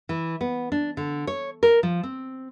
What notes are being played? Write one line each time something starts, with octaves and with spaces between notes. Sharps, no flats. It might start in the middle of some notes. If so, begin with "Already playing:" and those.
E3
B3
D4
D3
C#5
A#4
F3
C4